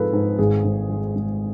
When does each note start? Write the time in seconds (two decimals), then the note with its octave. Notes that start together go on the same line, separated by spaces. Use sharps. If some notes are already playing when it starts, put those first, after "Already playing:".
Already playing: G#2 F3 C4 F4 G#4 A4 B4
0.13 G#2
0.38 G#1 G#4
0.64 G#2
0.90 G#3
1.16 G#3